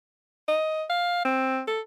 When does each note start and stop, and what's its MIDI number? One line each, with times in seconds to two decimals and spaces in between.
0.48 0.84 75
0.90 1.21 77
1.25 1.62 60
1.67 1.80 69